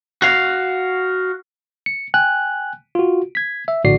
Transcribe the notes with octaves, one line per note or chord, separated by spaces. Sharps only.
F#4 F5
C#7
G5 G#5 F#6
F4 F#4
G#6 B6
E5
A#1 A2 D3 F#4 D5 C7